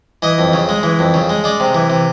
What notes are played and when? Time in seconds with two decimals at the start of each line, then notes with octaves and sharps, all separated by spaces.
0.22 E3 D#5
0.39 F2
0.53 C#3
0.69 G#3
0.83 E3
0.99 F2
1.14 C#3
1.29 G#3
1.44 G#3 D5
1.60 C3
1.74 E3
1.90 C3